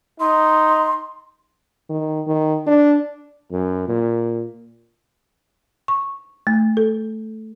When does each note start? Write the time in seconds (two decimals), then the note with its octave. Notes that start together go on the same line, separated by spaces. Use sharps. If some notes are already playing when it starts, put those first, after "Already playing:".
0.20 D#4 C6
1.90 D#3
2.27 D#3
2.67 D4
3.51 F#2
3.88 A#2
5.88 C#6
6.47 A3
6.77 A4